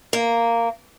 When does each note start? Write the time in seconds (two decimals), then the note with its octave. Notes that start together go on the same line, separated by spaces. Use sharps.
0.13 A#3